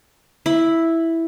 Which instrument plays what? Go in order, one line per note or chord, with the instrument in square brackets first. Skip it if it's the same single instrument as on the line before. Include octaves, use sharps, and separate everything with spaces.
[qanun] E4